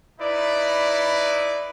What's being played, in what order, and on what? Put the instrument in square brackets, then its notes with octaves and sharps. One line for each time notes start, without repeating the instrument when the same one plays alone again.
[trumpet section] D#4 E4 B4 D5